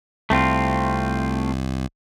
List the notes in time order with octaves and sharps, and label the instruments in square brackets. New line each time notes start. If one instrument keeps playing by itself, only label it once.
[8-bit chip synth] C2 [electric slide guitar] A3 C4 F4